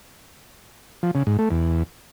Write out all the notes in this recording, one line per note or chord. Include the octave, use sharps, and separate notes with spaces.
F3
C#3
G#2
A3
E2